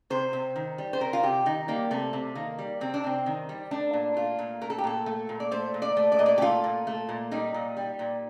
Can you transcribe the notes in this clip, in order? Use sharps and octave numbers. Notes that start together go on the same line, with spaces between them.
C3 C5
C3
D#3
G3
C5
C3 A#4
F4
C3 G4
D#3 D#4
G3 A#3
C3 A3
C3
D#3 A#3
G3
C3 C4
D4
C3 C4
D#3
G3
A3 D4
A#2
A3 F4
A#2
A3 A#4
A4
G4
A#2 A4
A3
A#2
D5
A3 C5
A#2
D5
A3
D5
A#2 D#5
D5
G4
A3 F4
A#2
A3
A#2
G3 D#4
A#2
G3
A#2